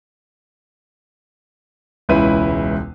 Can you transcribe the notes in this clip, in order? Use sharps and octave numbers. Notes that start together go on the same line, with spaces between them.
E1 C#2 C#4 E4 B4 D#7